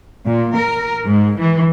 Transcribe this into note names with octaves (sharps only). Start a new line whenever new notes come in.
A#2
A#4
G#2
E3